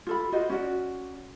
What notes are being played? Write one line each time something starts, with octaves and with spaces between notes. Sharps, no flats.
F4 A4 B5
F4 F#4 C5 D#5
C#4 F#4 D5